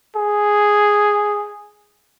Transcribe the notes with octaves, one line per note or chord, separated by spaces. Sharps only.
G#4